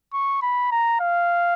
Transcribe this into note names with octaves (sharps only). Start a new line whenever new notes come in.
C#6
B5
A#5
F5